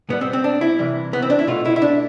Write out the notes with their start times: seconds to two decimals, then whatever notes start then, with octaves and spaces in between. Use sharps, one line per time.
0.09 B2 G3 B3
0.21 C4
0.33 C4
0.44 D4
0.61 E4
0.78 C3 E3 G3
1.13 B3
1.22 C4
1.30 D4
1.39 E4
1.47 B2 A3 F4
1.65 E4
1.76 E4
1.82 D4